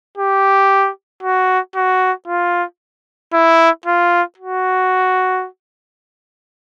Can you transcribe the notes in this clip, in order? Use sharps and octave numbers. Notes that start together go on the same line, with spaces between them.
G4
F#4
F#4
F4
E4
F4
F#4